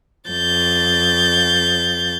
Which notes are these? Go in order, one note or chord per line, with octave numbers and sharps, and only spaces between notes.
F2 G6 A6